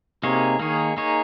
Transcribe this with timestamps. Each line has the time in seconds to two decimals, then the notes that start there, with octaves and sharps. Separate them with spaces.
0.23 C3 A#3 D#4 G#4 C#5
0.59 D#3 A#3 D#4 G#4 C#5
0.97 A#3 D#4 G#4 C#5